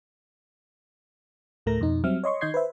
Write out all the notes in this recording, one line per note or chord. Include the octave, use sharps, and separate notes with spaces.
D2 A2 A3 A#4 A#6
F2 B2 D#4
F#3 G3 C4 E5 F6
C#5 D#5 C6 C#6
D#3 D#4 D#5 G6 G#6 C7
B4 C5 E5